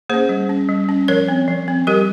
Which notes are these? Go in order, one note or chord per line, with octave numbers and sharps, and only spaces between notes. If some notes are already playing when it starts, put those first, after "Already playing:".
A#3 C#4 G#4 C5
G3
C#4
G3
C#4
F3 A#4 C#5
C4
F3
C4
G3 G4 A#4